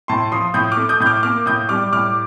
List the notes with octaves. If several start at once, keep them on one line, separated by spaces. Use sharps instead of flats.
A2 A5 C6
F3 C6 D#6
A2 D#6 G6
D6 F6
A3
D#6 G6
A2 G6
D6 F6
A#3 D6 F6
A2 D#6 G6
G3 D6 F6
A2 D6 F6